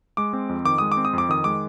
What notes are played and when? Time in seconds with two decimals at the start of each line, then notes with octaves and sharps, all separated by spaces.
0.17 G#3 D6
0.33 C4
0.49 F2
0.65 D#3 D6
0.78 G#3 D#6
0.92 D6
0.97 C4
1.05 D#6
1.13 F2 D6
1.29 D#3 D#6
1.44 G#3 D6